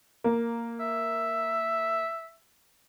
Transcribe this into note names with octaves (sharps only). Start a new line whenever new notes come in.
A#3
E5